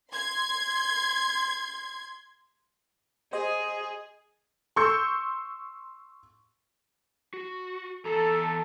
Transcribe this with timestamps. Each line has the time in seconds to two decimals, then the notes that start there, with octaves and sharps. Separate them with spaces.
0.12 C6 G#6
3.33 G#4 C5 D#5
4.76 C6 C#6 E6 G6 C#7
7.34 F#4
8.05 E2 A4 A#5